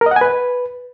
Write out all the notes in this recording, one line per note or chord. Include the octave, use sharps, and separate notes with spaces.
A#4
D#5
F#5
G#5
B4